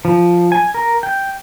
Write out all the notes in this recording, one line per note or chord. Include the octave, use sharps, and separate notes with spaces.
F3
G#5
A#4
G5